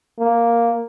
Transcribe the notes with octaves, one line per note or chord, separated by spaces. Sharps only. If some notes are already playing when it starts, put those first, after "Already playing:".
A#3